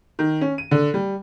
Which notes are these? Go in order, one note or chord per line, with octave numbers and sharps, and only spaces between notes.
D#3
C#4
D#7
D3
G3